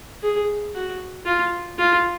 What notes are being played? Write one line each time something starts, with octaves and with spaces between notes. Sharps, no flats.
G#4
F#4
F4
F4